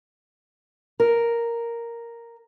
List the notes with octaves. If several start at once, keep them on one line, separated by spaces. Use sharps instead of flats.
A#4